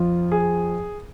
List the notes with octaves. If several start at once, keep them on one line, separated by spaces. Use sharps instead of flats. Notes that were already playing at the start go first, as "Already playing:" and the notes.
Already playing: F2 F3 F4
G#4